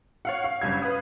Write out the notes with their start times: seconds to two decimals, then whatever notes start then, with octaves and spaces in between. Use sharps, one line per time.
0.25 C#5 F5 F#5
0.44 F5
0.61 F#1 G2 G#6
0.82 B4 F5 D#6